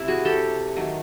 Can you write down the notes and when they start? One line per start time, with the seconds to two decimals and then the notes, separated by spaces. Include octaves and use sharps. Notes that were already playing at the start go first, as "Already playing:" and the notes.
Already playing: C3 E4
0.08 F#4 G#4
0.25 G4 A4
0.76 D#3 F#3 A3